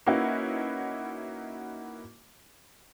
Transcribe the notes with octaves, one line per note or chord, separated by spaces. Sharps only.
A#3 C#4 D#4 E4 F#4 B4